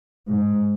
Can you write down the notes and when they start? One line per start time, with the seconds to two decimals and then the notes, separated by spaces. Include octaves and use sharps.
0.25 G#2